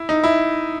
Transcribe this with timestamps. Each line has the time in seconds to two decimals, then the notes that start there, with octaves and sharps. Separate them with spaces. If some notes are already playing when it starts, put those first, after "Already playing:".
Already playing: E4
0.09 D#4
0.24 E4